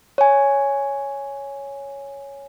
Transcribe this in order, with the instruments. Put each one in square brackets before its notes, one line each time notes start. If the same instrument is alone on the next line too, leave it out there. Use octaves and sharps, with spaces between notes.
[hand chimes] C#5 G#5